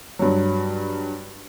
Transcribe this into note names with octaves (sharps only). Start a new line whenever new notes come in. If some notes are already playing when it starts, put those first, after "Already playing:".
G2 F#3